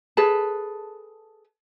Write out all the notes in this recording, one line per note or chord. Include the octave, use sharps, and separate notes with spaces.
G#4 A4 B4 A5